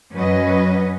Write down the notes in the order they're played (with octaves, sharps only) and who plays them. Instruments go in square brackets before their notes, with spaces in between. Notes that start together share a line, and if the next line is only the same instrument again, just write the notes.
[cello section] F#2 F#3 C#4 B4 D#5